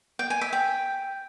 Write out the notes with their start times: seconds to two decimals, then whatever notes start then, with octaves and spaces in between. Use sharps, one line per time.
0.19 G5
0.30 G#5
0.41 E5
0.53 G5